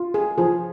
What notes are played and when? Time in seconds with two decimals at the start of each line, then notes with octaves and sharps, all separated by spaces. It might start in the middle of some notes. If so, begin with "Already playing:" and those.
Already playing: F4
0.14 G#4
0.38 F3 G#4